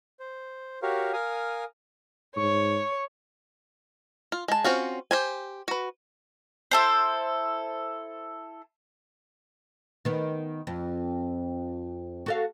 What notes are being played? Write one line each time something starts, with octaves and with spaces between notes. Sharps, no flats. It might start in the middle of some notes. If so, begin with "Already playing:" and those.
C5
F#4 G4 A#4 C#5 F5
A#4 F5 G#5 D#6
G#2 C#5 C#6
F4
G#3 A5
C4 C#4 F4 F#4
G4 C5 G#5
F#4 B4
E4 A4 C5
D#3 B3
F2
F#4 A4 F5